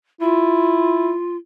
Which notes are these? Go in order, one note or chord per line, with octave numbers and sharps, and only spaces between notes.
E4 F4